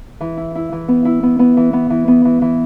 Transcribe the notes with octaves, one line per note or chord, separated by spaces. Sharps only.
E3
E4
E4
E3
B3
E4
B3
B3
E3
B3
E3
B3
E3
E3